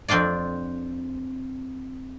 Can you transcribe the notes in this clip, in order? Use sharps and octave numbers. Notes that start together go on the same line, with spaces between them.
F2 C4 D4 F4 D5